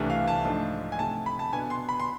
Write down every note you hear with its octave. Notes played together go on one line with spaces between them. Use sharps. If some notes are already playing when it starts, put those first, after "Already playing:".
Already playing: C2 C3 E3 A3 D4
F5
A5
G#2 F3 A3 D4
G#5
C3 F3 A3 A5
B5
A5
B2 B3 D4 G#5
C6
B5
C6